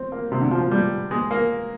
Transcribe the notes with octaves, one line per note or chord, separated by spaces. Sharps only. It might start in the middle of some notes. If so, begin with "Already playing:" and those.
Already playing: C4
A#3
C3
D3
F3
F3
G3
G#3
A#3